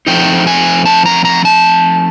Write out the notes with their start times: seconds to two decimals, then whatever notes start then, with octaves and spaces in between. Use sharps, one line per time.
0.07 F3 A3 C4 D#4 G5
0.47 G#5
0.86 A5
1.06 A#5
1.25 A#5
1.45 A5